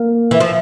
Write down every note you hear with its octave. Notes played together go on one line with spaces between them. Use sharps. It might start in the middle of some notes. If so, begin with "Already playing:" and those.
Already playing: A#3
E3
F3